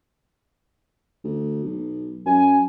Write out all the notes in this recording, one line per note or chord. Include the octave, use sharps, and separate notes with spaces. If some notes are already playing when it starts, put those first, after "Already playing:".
D2
B1
F#2 G#5